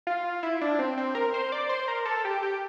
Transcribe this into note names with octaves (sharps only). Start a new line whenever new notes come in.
F4
E4
D4
C4
C4
A#4
C5
D5
C5
A#4
A4
G4
G4